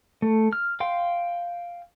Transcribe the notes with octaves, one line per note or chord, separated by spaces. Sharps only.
A3
F6
F5 G5 C6